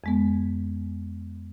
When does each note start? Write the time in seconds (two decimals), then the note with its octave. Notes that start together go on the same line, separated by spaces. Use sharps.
0.04 F2 G#3 B3